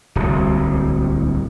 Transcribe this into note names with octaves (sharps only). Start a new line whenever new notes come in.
D1 C2